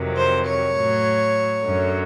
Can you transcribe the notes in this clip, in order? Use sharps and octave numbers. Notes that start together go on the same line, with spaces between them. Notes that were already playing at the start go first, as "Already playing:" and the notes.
Already playing: F2 C3 D#3 F#3
C5
C#5
A2 F#3
F#2 D3 F#3